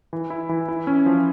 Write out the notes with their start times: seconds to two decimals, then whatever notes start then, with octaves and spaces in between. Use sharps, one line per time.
0.13 E3
0.30 E4
0.49 E3
0.69 E4
0.87 C#4
1.06 F3